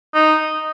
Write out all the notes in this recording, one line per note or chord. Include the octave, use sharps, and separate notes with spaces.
D#4